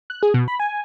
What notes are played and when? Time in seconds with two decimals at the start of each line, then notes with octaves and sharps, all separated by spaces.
0.10 F#6
0.23 G#4
0.34 B2
0.48 B5
0.60 G#5